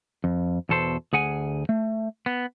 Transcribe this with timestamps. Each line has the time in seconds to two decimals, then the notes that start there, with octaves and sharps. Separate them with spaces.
0.24 F2
0.69 E2 B2 A4 C5
1.13 D2 G#4 F#5 G#5
1.69 A3
2.26 B3